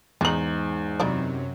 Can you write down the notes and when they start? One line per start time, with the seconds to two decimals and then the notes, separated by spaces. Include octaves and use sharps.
0.21 E2 G#2 G#3 D#4 F#7
1.00 F#2 C3 F#3 D#4 E4 D5